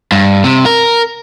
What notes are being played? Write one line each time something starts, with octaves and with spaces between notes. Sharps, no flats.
G2
C3
A#4